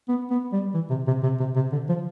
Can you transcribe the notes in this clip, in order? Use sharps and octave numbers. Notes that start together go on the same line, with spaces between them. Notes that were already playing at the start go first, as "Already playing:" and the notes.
B3
B3
G3
E3
C3
C3
C3
C3
C3
D3
F3